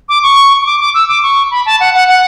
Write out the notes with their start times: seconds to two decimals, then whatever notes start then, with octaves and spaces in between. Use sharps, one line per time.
0.09 D6
0.23 C#6
0.61 C#6
0.66 D6
0.80 D6
0.94 E6
1.08 D6
1.23 C#6
1.51 B5
1.66 A5
1.80 F#5
1.94 F#5
2.08 F#5